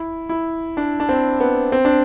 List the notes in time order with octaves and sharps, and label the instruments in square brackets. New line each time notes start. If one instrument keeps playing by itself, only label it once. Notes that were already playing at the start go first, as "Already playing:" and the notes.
Already playing: [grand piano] E4
E4
D4
D4
C4
B3
C4
D4